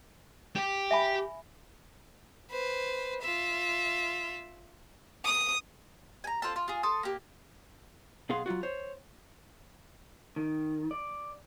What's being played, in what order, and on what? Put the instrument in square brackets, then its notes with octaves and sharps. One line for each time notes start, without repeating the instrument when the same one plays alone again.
[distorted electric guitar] G4
[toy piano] E5 G#5 B5
[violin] B4 C5
F4 E5
D#6
[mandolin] G#5 A#5
C4 F4 A4 A5
F4
F4 G#4
A4 A5 C6 D#6
A#3 G4
[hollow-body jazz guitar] B1 B3 G#4 F5 C6
F#3 G#3 F4 F#4
C5 C#5
[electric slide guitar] D#3
D5